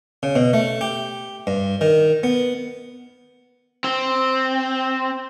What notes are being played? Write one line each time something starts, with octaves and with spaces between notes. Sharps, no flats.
C#3
B2
A3
G4
G2
D#3
B3
C4